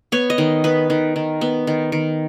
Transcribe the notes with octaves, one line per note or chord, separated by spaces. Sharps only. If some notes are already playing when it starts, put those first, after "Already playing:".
B3 C#5
D#5
D#3
B3 B4
D#3
D#3
B3
D#3
D#3